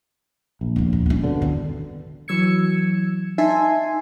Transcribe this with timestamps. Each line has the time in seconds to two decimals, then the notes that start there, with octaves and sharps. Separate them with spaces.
0.61 A#1
0.76 B1 F3
0.93 D#2
1.06 G3 C#4
1.24 B2 D3
1.42 E1 D#3
2.28 E3 F#3 E6 G#6 C#7
3.38 D#4 E5 G#5 A5 C6